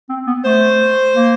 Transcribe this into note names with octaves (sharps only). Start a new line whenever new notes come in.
C4
B3
A3 C5
A#3